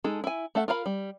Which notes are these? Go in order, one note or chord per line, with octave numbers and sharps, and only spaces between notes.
G#3 D#4 G#4 A4
E4 G#5
A3 A4 E5 F#5
F4 A#4 F5 B5
G3